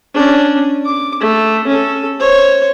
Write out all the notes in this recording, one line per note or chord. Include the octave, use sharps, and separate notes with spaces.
C#4 D4
D6
A3
C#4 A4
C5 C#5